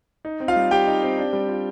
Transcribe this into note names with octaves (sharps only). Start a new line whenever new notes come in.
D#4
C4
F4 F5
G3
G3 G4 G5
D#4
C4
D4
G3
F4